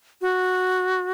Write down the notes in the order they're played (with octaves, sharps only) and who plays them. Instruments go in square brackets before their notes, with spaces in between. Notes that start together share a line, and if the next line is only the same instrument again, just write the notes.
[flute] F#4